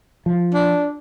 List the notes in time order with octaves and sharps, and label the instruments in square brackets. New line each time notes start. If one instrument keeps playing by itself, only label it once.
[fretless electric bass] F3
[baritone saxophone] D4